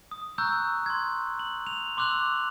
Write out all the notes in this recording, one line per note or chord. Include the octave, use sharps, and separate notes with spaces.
D#6
A#5 C#6 E6 F#6 G6
C6 G#6
F#7
F7
C6 D6 E6 F#6 F7 F#7